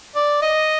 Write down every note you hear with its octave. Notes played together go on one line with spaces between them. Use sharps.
D5
D#5